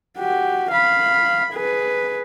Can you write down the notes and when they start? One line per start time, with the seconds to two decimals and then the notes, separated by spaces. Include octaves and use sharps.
0.18 F#4 G4
0.71 F5 B5
1.54 G#4 B4